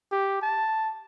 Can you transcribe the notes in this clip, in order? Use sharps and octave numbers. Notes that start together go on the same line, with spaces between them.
G4
A5